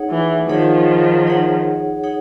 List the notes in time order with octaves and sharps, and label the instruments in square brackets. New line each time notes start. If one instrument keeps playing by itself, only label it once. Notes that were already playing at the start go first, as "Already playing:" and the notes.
Already playing: [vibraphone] D#4 G#4 C#5 F#5
[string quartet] E3
[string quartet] D#3 F3 [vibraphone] D#4 G#4 C#5 F#5
[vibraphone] D#4 G#4 C#5 F#5
D#4 G#4 C#5 F#5